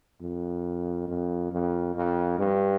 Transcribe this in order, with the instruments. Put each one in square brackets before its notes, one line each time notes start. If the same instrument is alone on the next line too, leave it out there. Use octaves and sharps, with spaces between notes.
[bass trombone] F2
F2
F2
F2
G2